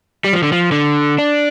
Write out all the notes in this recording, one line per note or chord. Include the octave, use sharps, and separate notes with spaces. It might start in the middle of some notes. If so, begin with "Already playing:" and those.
G3
F3
D3
F3
D3
D4